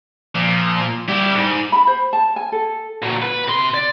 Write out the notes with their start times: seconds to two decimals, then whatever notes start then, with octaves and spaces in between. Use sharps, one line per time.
0.35 A#2 F3
1.08 G3 E4 G4
1.34 G#2
1.72 B5
1.87 C5
2.13 A5
2.36 G#5
2.52 A4
3.03 A#2 F#3
3.23 B4
3.49 C3 C6
3.74 D5